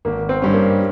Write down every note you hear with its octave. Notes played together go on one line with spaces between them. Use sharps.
G#1 A#3
C4
G2 G3 C#4
A#3